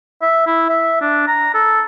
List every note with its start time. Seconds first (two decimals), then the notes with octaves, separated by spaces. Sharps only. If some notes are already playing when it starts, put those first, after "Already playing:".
0.22 E5
0.47 E4
0.69 E5
1.02 D4
1.27 A#5
1.54 A4